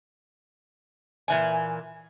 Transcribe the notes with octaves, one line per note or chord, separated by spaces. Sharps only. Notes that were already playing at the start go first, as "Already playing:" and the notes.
A#2 E3 G#5